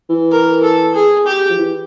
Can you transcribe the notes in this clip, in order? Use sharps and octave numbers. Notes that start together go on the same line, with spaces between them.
E3
A#4
A4
G#4
G4
F3
E3